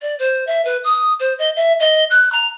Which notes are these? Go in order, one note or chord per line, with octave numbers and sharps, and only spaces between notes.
D5
C5
E5
B4
D#6
C5
D#5
E5
D#5
F#6
A#5